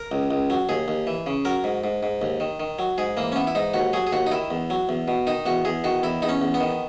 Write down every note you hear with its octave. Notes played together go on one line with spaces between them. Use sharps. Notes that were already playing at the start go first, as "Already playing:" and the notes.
Already playing: A#4
C#2
C#2
F#3
D#2 G#4
D#2
E3
C#3
F#3 A#4
G#2
G#2
G#2
D#2
D#3
D#3
F#3
G#2 G#4
E3 A#3
C#4
E3 B3
E4
G#2 D#4
D#2 F#4
F#3 G#4
G#4
D#2 F#4
D#4
D#3 E4
E2
F#3
E2
B2
D#3 D#4
E2 F#4
E2 G#4
D#3 F#4
E2 E4
E2 D#4
C#4
E2
B3
D#3